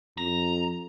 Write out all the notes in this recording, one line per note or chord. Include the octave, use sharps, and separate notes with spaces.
F2 A#5